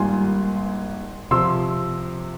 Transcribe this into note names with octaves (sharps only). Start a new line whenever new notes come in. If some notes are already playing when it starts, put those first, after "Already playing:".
Already playing: G#1 G2 G3 A#3 F4 G#5 C6
C3 F3 C6 E6